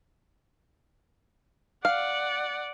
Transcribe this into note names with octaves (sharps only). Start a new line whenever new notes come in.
D5 F5 F#5